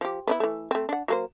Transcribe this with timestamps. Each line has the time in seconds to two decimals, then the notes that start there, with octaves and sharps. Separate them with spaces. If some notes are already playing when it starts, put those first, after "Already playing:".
0.01 F3 G4
0.27 B3 D4 E4
0.40 E3 A3
0.71 A3 C4
0.89 D4 F#5
1.08 F#3 A#3 C5